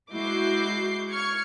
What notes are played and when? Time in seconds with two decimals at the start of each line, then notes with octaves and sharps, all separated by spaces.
0.12 G#3 E4 F#4 D6 G6 C7
1.11 C#6 F6 G#6 C#7